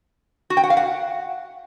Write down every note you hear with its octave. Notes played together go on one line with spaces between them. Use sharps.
F#4
G5
F#5
F5
F#5